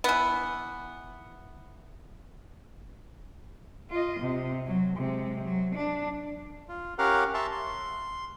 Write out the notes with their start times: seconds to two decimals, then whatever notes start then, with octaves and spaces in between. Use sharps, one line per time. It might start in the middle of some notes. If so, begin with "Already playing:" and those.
0.04 E3 B3
3.90 F4 D#5
4.20 C3
4.67 F#3
4.97 C3 G#3
5.43 F#3
5.75 D4
6.69 F4
6.98 C#4 G4 A#4 F5 F#5
7.34 E5 A5 C6 C#6
7.52 C6